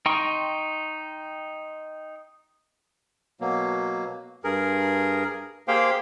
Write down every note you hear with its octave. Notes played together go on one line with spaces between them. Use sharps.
D#4 G5 C6 C#6
B2 F#3 A#3
G2 G#4 A#4
A#3 G4 G#4 C5 F5 G5